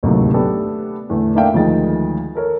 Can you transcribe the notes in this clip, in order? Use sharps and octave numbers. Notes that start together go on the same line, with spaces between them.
D1 A1 D#2 C3 F#3 A3
A3 B3 D4 G4 A4
E2 A2 D3 A3
A3 A#3 D4 E5 F5 G5
D2 D#3 F3 G#3 G#4 A6
A4 A#4 C#5